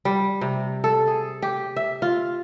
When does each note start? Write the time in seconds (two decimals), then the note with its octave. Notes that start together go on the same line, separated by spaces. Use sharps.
0.05 G3
0.41 C3
0.84 A4
1.07 G#4
1.42 G4
1.76 E5
2.02 F4